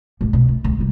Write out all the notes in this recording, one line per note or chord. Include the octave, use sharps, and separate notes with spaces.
A1 A2
B2
A3
D2
C3 G3